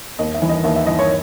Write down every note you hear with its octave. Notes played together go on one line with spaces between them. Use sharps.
D#2 D#5
E5
E3
D#5
D#2 E5
E5
E3 D#5
C#5